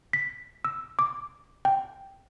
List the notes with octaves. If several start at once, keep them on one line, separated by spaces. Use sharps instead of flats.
B6
E6
D6
G5